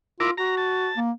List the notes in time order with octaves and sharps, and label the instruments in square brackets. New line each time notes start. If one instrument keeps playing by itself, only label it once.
[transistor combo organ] E4 A#4 D6 [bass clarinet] F4
[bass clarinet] F#4 [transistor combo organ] A#5
[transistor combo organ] A5
[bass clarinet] A#3